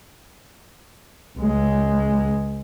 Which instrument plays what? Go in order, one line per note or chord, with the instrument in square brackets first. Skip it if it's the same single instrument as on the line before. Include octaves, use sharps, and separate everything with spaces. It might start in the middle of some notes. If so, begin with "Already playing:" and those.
[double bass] C#2 G#3